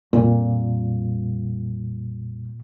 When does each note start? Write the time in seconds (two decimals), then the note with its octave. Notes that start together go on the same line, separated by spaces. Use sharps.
0.13 F2 A#2 G3